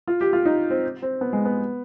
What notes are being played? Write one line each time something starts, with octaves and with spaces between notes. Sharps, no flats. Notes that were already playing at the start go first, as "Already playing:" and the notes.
F4
G4
F4
D#4
C4
C4
B3
G#3
B3